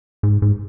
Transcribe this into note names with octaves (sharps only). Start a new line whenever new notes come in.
G#2
G#2